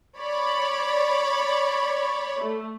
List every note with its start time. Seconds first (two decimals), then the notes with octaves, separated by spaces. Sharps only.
0.18 C#5 D5 B5
2.42 A3